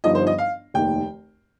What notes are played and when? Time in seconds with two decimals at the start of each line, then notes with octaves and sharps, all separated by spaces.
0.04 G1 G2 F3 D#4 D#5
0.15 C5
0.27 D#5
0.38 F5
0.74 F1 D#2 D#3 G5